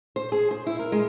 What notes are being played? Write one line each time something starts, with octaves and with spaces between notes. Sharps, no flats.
C5
G#4
C5
E4
A#4
G#3